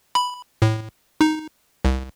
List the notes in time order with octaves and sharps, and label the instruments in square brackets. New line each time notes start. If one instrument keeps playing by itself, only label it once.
[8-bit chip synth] B5
A2
D#4
C2